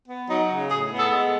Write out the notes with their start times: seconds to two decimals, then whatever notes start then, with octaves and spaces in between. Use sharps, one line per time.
0.08 B3
0.29 F#3 D#4
0.50 C#3
0.70 A2 G#4
0.91 B3
0.98 A4
1.12 G#3